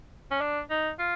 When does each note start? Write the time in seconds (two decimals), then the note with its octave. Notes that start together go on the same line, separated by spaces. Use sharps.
0.31 C#4
0.41 D4
0.70 D#4
0.99 F4